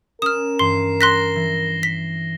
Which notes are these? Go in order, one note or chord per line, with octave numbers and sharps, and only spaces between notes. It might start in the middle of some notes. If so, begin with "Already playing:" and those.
C#4 A#4 D#6 F6 E7
G2 E3 C6 C7
C6 F#6 A#6 B6 G7
E3
B6